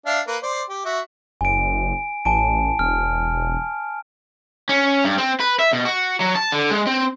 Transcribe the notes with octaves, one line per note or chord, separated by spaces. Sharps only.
D4 E5 F5
A#3 B4
C5 D5
G4
F#4 E5
F#1 G#5 D7
A1 G#5 A5 D7
E1 F6
C#4
G2
C4
B4
E5
B2
F#4
F#3
A5
D3
G#3
C4